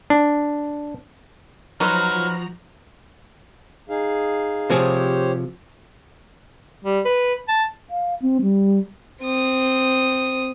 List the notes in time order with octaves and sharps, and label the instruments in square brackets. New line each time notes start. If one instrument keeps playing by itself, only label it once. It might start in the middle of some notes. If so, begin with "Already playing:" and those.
[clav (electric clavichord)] D4
[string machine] F3 A#5 [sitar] F#3 [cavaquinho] D#4 B4 C5 [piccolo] F6
[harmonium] D#4 G#4 F5
[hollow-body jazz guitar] C3 F3 G#4 [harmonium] G4 C5 C#5
[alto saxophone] G3
B4
A5
[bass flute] F5
C4
G3
[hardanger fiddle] C4 D#6